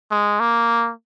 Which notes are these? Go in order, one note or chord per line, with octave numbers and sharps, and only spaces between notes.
G#3
A#3